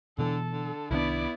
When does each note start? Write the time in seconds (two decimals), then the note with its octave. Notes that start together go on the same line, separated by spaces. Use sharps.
0.19 B2 D3 E3 A4
0.51 D3
0.91 C2 D#3 B3 D4 E4 D5